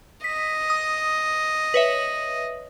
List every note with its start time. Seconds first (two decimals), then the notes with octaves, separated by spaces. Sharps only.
0.24 D#5 B6
0.70 D#6
1.74 B4 C#5 E5